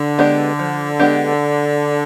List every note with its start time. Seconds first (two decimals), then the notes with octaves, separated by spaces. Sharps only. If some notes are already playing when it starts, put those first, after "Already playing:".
Already playing: D3
0.18 G#3 B3 D4 G4
0.59 F3
1.00 G#3 B3 D4 G4